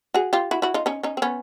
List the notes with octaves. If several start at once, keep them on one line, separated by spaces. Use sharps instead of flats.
F#4 G#4
F4 G4
E4 F#4
E4 F#4
D#4 F4
C#4 D#4
C#4 D#4
C4
B3 C#4